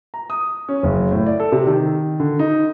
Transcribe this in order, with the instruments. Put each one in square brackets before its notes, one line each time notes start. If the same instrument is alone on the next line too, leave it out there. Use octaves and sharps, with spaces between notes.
[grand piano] A#5
D#6
C#4
F#1
A2
D5
A4
C3
D#3
D3
D#4